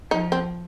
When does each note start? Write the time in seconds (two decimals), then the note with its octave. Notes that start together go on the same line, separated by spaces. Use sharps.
0.11 F3 D#4
0.32 C4